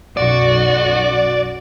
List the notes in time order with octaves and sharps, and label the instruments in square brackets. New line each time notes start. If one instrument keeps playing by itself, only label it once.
[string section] B1 F#2 F#4 [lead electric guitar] D5